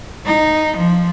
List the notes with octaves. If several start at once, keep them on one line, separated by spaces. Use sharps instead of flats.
D#4
F3